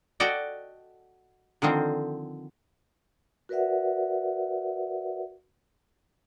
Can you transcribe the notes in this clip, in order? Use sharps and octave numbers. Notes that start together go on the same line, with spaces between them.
F#4 A4 D5 D#5 F#5 G5
D3 D#3 F3 C4
F#4 A#4 B4 D5 E5 F#5